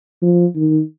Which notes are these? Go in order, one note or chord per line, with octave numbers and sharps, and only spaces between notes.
F3
D#3